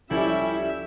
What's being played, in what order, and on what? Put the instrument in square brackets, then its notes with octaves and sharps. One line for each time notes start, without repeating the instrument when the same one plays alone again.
[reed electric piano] C#2 F3 A4 [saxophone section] G3 E4 [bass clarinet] C#4 [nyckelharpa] E5